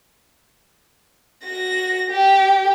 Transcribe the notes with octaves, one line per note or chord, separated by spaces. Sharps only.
F#4 A#6
G4